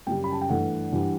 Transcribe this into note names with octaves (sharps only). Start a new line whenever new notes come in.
F#2 C#3 G3 G5
B5
A5
G5
G2 E3 A3 F#5
G2 E3 G3